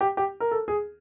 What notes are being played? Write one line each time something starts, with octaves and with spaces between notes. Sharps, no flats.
G4
G4
A#4
A4
G#4